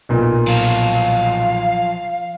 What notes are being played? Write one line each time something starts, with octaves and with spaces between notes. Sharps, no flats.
B1 A#2
F3 F#3 F5